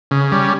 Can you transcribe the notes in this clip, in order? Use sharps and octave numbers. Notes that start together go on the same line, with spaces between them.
C#3
G3 C#4